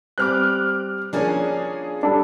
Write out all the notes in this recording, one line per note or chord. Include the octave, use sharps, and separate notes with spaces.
G3 C4 D6 F6 F#6
F3 A#3 C#4 D4 G#4 C#5 D5
G3 D4 A4